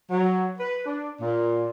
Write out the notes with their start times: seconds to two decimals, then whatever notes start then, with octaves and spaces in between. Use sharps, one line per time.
0.11 F#3
0.59 B4
0.86 D4
1.21 A#2